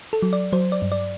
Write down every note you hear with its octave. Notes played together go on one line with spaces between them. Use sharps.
A4
F#3
D5
F#3 C5
D5
G2
D5